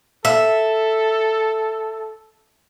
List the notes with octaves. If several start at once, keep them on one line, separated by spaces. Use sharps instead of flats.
A4 E5